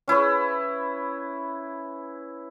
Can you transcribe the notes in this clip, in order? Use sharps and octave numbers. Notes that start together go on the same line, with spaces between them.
C#4 E4 B4 C#5